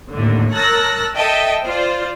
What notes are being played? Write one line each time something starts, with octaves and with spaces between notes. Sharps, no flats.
G#1 D#2 A2 D3
A#4 C#5 A5 E6 F#6 A#6
A4 D#5 E5 G5 A5
F4 C5 D5